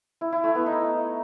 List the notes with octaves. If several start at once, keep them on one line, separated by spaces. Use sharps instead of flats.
E4
E4
A3
B3
D#4